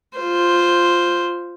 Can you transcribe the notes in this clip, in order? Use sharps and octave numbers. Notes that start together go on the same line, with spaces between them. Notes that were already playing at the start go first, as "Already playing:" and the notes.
F4 C5